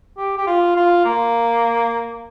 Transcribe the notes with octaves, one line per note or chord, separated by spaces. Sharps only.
G4
G4
F4
F4
A#3